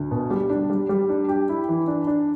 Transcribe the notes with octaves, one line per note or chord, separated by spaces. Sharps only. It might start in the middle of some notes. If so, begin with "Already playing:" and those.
Already playing: D2
B2
G3
D4
G3
G3
D4
G4
E4
E3
D4
D4